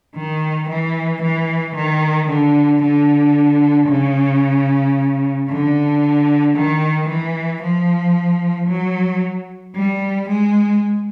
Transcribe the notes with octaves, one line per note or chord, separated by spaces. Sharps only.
D#3
E3
E3
D#3
D3
D3
C#3
D3
D#3
E3
F3
F#3
G3
G#3